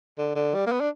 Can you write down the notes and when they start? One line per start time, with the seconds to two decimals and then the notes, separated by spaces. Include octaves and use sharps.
0.18 D3
0.36 D3
0.54 G3
0.67 A#3
0.72 B3
0.81 D4